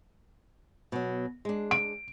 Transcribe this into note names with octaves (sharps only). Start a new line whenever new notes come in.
B2 F#3
G#3 D4
D7